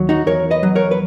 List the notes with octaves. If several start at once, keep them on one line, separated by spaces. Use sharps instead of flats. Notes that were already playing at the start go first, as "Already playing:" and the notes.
Already playing: D#2 F#3
D#4 F#4
E2 A#4 C#5
B4 D#5
F#3
A#4 C#5
B4